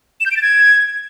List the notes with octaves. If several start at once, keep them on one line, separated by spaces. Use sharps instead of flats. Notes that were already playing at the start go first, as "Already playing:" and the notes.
E7
G6
D7
A6
G#6